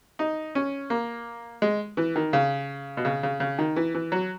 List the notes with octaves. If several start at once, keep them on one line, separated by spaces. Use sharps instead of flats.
D#4
C#4
A#3
G#3
E3
D#3
C#3
B2
C#3
C#3
C#3
D#3
E3
E3
F#3